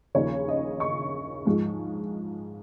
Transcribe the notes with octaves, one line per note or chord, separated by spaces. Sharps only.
D#2 C#3 F3 A#3 C#5
D#5
C#6
G#2 F3 G#3